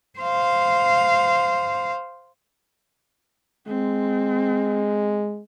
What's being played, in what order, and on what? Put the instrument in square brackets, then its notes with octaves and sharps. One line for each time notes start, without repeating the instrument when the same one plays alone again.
[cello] C5 F5
[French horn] G#3 [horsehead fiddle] C4